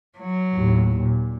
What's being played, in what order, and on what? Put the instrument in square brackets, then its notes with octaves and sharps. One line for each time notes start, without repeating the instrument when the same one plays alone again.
[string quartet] F#3
[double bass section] D#2 A2
A#2